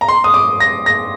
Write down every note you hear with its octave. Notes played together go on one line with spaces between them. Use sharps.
A#5
C6
D#6
D6
A#6
A#6